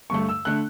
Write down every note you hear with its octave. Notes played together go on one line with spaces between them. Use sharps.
G2 D3 A3 C#6
E6
D3 A3 F#6